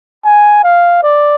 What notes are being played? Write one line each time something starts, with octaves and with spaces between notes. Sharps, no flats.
G#5
F5
D5